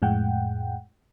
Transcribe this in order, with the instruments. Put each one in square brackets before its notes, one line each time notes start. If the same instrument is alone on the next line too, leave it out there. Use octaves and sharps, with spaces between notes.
[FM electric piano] F2 A2 G#3 F#5 G5